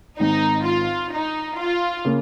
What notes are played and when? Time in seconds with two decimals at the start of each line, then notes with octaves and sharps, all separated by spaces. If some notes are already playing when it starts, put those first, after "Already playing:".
0.20 G#1 G#2 D#3 D#4
0.65 F4
1.13 D#4
1.59 F4
2.05 C#3 A#3